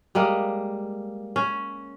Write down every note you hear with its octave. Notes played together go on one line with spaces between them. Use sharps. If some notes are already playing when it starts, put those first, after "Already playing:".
G3 G#3 A#3
C#4